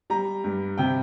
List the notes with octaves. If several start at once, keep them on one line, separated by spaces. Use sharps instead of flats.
G3 A#5
G2
C3 G5